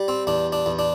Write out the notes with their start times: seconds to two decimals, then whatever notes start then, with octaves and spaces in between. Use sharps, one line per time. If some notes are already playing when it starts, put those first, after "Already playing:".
Already playing: G3
0.08 C4
0.27 E2 D4
0.52 D4
0.66 E2
0.79 D4